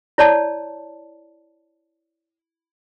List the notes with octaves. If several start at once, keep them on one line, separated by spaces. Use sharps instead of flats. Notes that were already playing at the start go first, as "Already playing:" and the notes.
E4 C#5 D5 A5